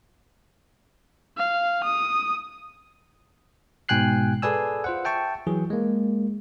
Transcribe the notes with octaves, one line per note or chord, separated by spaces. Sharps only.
F5
D#6
G#2 B2 G5 G#5 F#6 C7
G#4 A4 B4 D5 G#5 E6
F4 C5 F#5
E5 G5 A5 C#6
E3 F#3 G#4
G#3 A#3